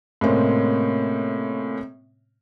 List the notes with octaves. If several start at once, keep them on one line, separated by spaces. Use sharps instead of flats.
A2 C3 G#3 A#3 C4 C#4